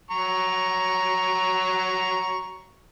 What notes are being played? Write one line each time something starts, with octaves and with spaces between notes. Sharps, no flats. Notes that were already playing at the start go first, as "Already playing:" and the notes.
F#3 A#5 C#6